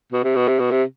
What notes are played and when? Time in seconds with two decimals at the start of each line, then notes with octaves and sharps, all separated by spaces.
0.12 B2
0.24 C3
0.36 B2
0.48 C3
0.59 B2
0.71 C3